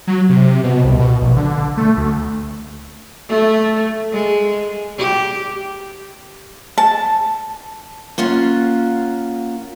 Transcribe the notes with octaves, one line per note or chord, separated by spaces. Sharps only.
F#3
C3
B2
C2
B2
A#1
D3
A3
D2
A3
G#3
G4
A5
A#3 C#4 F4 F#5